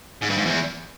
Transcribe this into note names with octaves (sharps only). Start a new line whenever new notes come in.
G#2
G2
G#2
E2